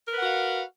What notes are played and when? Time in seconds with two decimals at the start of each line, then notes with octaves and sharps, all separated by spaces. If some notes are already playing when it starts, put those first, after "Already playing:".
0.07 A#4
0.12 B4
0.16 F#5
0.21 F#4
0.25 F5